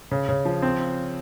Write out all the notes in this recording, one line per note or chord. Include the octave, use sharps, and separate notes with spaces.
C#3
C#3
F3
C4